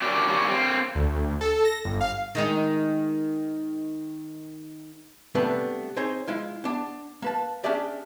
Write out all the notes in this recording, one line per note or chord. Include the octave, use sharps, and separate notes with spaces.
C#4 D4 F#4 G4 A#4 D5
C#3 G3 A#3 C#4 F#4
A#3 C4
D2
A4
A#6
G1
F5
D#3 G#3 D#4
C3 G3 A3 B3 D4 B4
C4 D#4 G#4 C5 C#5
G#3 E4 F4
B3 D4
A#3 B4 A5
C#4 D4 G4 G#4 D5 E5